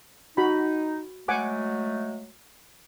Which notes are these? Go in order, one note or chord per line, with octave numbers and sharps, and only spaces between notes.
D#4 F#4 B5
F#3 G#3 A3 F#5 G#5 D6